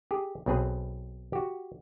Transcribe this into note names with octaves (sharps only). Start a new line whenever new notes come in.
G4 G#4
B1 B2 C4 G#4 B4
F#4 G4